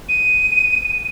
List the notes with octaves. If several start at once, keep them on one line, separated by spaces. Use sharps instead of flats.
D#7